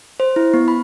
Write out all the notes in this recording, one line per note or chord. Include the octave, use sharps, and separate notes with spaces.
C5
E4
B3
B5